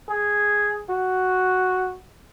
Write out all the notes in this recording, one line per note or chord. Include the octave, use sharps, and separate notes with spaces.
G#4
F#4